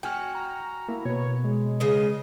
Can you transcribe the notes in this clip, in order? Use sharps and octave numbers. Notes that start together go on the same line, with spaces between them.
F#4 G5 G#5 F6
A#5
A#3 E4
B2 B4 C#5
G#3
C#3 D#5